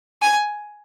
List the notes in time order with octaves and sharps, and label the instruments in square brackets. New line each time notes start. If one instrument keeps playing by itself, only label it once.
[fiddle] G#5